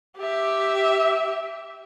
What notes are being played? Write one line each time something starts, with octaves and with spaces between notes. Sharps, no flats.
G4 E5